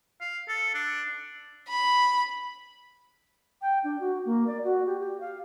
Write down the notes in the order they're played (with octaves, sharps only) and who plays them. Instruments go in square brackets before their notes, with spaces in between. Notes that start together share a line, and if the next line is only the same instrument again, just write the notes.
[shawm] F5
A4
D4
[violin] B5
[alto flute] G5
D4
F#4
A#3
D5
F#4
G4
G4
F5